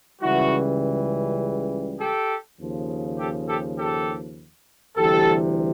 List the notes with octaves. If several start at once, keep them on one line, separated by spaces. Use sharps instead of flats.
C#2 C#3 E3 G3 E4 F#4
G4 A4
D#2 C#3 F3
G4 A4
G4 A4
G4 A4
D2 C3 E3 G3 G4 A4